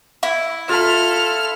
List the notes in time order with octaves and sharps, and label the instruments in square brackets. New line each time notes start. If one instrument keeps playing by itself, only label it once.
[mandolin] E4
[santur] F4 B5 [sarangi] A4 [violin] F6